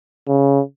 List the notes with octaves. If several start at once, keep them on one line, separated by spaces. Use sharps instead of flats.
C#3